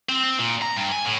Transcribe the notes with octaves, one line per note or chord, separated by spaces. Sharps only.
C4
C4
A#2
A#5
G2
G#5
A2